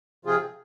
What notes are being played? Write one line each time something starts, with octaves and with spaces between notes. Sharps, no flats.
C3 F3 C4 F4 G#4